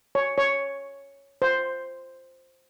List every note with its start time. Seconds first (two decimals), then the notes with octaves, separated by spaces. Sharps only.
0.15 C#5
0.38 C#5
1.42 C5